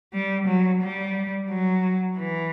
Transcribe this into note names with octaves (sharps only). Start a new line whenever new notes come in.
G3
F#3
G3
F#3
E3